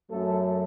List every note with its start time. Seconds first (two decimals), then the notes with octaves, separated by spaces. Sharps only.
0.11 F#2 F#3 A3 A4